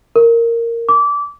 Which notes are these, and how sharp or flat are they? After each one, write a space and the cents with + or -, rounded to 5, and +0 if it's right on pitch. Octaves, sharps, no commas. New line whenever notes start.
A#4 -10
D6 -20